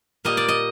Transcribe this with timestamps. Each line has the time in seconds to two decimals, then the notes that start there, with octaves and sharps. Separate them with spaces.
0.25 A#2 G3 A#3 D#5
0.37 D5
0.48 D#5